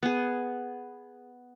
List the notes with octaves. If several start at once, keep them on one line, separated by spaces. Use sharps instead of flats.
B3 G#4